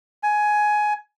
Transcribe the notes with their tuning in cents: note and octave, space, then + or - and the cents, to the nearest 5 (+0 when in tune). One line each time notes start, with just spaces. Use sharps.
G#5 +15